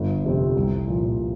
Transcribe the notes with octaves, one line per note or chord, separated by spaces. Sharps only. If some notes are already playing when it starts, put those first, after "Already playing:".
Already playing: G1
F2 C3 G3 C4
C2
A#2 F3